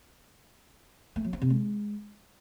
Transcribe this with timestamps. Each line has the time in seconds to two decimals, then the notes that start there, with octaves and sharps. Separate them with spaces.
1.16 A3
1.24 F#3
1.33 C4
1.42 C3
1.50 G#3